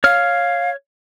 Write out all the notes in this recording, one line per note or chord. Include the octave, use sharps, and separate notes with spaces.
C#5 F5 F6